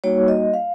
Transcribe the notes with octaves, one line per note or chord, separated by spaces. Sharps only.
G3 A#3 D#4 F#4 C#5
D#5
F5